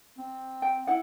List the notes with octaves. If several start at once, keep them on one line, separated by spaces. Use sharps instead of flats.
C4
G5
E4 F#5